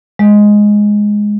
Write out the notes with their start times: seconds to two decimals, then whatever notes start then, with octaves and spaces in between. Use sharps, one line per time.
0.19 G#3